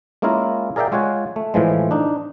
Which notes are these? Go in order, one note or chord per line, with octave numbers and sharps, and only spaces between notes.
G#3 A#3 C#4 E4 F4 A#4
G#4 A#4 D5 E5 F5 G5
G#3 F4 C#5 F#5 G#5
A3
A2 E3 F3 G#3
D4 D#4